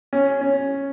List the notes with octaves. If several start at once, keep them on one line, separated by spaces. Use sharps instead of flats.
C#4
C#4